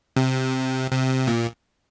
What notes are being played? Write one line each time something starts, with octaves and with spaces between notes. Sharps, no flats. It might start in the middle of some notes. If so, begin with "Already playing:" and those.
C3
C3
A#2